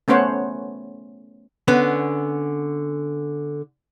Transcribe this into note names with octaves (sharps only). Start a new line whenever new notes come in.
A3 B3 C#4 C5 C#5 F#5
D3 B3 C#4